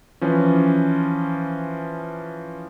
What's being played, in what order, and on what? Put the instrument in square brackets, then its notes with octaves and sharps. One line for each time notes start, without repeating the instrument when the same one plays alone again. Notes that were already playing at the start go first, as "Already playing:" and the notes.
[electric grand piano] E3 F3 C#4